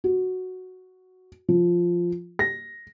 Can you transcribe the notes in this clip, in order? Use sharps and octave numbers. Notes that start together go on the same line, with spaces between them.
F#4
F3
A#6